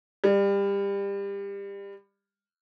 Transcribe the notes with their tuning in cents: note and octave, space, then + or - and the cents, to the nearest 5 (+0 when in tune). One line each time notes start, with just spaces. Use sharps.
G3 +25